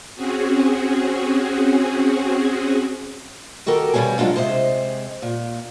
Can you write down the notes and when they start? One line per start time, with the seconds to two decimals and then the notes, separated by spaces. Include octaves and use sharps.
0.16 C4 C#4 F#4 G#4
3.66 D#3 F#4 G4 A4 A#4
3.94 G2 B2 G3 A#3 C#5 G#5
4.18 F#3 G#3 D4 F4
4.36 C3 G#3 C5 D#5
5.22 A#2